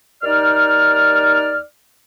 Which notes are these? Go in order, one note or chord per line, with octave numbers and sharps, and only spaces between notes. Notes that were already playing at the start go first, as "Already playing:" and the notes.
D#2 D#4 D5 F6